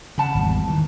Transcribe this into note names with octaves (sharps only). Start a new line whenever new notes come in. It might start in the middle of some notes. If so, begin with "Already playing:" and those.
C#3 F#5 A5 B5
G#1 E2 G3
D#3 E3